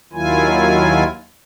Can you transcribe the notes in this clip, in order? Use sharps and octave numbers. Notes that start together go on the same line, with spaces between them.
D#2 D#3 F#3 E4 F4 G#5